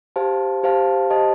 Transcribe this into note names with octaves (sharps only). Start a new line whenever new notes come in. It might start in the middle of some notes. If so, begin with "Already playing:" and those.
G4 C5 F5 A5
G4 C5 F5 A5
G4 C5 D#5 A5